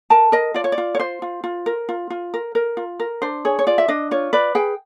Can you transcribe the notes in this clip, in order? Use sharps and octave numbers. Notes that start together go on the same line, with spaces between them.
A#4 A5
A#4 D#5
F4 D5
C#5
D5
F4
C#5
F4 C5
F4
F4
A#4
F4
F4
A#4
A#4
F4
A#4
D4 C5
G#4 C#5
C#5
F4 D5
E5
D4 D#5
F4 C#5
B4 D5
G#4 G5